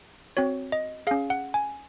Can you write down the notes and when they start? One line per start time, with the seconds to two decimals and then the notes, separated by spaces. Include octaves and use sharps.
0.37 C4 F#4 C#5
0.72 D#5
1.07 C#4 G#4 F5
1.30 F#5
1.54 G#5